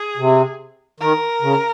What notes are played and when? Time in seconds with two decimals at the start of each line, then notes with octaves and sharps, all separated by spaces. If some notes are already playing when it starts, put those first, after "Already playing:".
Already playing: G#4
0.17 C3
1.00 D#3 A#4
1.42 C#3